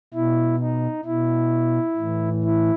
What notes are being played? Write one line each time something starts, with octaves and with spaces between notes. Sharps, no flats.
B2 E4
D#4
B2 E4
A2 E3
E4